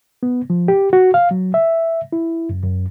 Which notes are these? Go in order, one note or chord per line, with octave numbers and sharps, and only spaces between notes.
B3
F3
G4
F#4
F5
F#3
E5
E4
F#2
F#2